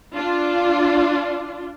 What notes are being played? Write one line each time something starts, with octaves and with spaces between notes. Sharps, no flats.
D4 F4